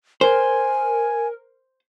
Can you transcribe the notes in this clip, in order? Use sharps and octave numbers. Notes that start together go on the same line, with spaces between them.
A#4 C5 G#5